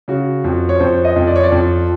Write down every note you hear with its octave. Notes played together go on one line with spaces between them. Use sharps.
C#3 F#4
F2
C#5
F2 C5
D#5
F2
D5
C#5
D5
F2